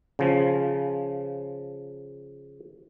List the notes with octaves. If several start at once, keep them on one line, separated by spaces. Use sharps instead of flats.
C#3 F3